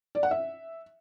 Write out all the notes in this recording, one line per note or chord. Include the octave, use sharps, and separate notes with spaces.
D5
F#5
E5